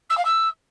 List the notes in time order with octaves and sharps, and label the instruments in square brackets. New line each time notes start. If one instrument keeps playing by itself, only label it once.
[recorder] E6
F5
E6